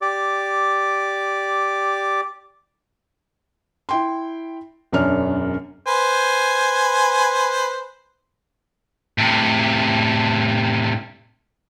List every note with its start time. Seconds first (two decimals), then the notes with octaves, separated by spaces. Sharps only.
0.02 G4 D5 D6
3.89 E4 G5 C6
4.92 E1 F#2 C#4 D4 F6
5.87 B4 C5 G#5
9.18 A2 C3